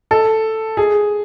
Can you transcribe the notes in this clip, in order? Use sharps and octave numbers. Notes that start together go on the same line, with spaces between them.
A4
G#4